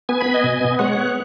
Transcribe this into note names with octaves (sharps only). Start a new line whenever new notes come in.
B3 G#5
B5
B3
D#5 G#5
B2
B3
G#3 C#5 F#5
B3